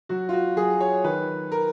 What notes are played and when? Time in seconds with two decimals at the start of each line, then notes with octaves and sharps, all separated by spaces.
0.09 F#3 F#4
0.29 F4
0.33 F#4
0.57 F#3 G#4
0.81 C#5
1.04 D#3 B4
1.52 A#4